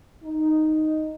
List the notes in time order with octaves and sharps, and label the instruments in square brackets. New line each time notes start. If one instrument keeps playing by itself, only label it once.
[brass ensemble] D#4